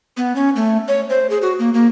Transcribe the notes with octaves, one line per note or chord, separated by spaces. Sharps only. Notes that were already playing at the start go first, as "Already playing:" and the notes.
B3
C#4
A3
C#5
C5
G#4
F#4
A#3
A#3